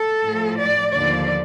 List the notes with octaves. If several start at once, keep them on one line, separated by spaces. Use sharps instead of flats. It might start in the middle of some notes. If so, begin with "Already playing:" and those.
Already playing: A4
A2 F3
D5
D#2 D3 F3 D5